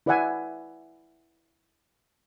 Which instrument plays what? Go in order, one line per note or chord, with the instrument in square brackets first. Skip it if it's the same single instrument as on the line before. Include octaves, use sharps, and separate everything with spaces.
[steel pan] E4 B4 D5 E5 F#5 G#5